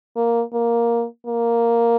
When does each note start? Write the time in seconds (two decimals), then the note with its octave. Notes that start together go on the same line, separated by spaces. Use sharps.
0.16 A#3
0.53 A#3
1.27 A#3